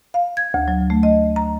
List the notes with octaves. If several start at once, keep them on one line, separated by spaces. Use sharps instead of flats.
F5
G#6
D2
F#3
A3
D#5
A#5